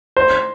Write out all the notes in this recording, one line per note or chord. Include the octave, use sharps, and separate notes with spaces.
C5